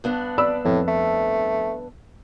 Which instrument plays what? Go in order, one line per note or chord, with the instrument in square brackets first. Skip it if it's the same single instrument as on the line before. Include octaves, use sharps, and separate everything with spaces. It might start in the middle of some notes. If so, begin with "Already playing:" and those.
[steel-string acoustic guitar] G2 B3 D4
[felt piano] D5 B5 E6
[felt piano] F2 [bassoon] A2
[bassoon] A3